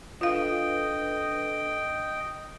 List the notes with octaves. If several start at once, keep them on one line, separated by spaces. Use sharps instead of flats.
D4 F4 A4 B4 D#5 F5 G5